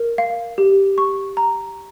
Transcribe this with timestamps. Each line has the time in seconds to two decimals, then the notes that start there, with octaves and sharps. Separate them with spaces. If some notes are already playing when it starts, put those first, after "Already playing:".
Already playing: A#4
0.18 F5
0.58 G4
0.98 C#6
1.37 A#5